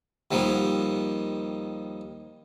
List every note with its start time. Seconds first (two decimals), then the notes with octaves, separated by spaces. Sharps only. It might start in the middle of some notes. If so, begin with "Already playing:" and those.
0.31 D#2 D#3 F3 G3 A#3